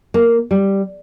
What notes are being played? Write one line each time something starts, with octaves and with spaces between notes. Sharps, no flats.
A#3
G3